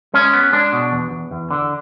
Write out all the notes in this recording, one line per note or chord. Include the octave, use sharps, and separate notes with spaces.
G#3 C#4
B3
G#3 D4
B2
E2
E2
E2
D3